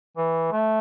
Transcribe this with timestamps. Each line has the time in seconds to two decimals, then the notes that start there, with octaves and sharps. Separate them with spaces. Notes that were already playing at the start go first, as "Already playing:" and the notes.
0.17 E3
0.52 A3